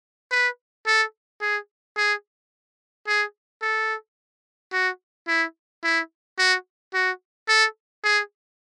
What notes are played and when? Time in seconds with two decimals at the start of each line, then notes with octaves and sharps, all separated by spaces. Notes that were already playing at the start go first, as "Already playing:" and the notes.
0.31 B4
0.86 A4
1.41 G#4
1.97 G#4
3.07 G#4
3.62 A4
4.73 F#4
5.28 E4
5.83 E4
6.38 F#4
6.94 F#4
7.48 A4
8.04 G#4